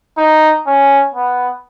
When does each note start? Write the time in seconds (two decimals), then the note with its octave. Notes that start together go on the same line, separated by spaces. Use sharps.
0.18 D#4
0.67 C#4
1.14 B3